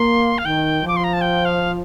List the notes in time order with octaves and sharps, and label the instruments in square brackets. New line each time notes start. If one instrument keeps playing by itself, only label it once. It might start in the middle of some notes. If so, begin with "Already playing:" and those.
Already playing: [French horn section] A#3 [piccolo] C6
[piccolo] F5
[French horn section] D#3 [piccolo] G5
[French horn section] F3 [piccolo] D6
[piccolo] C6
A#5
A5
G5
F5